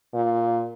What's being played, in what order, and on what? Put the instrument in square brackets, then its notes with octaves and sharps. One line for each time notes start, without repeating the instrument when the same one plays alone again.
[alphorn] A#2